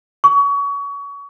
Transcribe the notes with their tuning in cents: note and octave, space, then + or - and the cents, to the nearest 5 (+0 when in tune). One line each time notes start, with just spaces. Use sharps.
C#6 +30